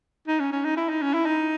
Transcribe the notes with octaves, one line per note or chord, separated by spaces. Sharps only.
D#4
C#4
C#4
D#4
E4
D#4
C#4
E4
D#4